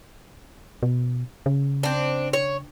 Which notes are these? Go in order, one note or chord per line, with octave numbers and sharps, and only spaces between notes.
B2
C#3
C4 D4
C#5